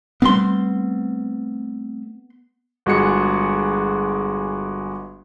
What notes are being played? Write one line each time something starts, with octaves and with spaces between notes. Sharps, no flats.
G3 A3 B3 C4 C6
G1 G#3 F#4 G#4 C#7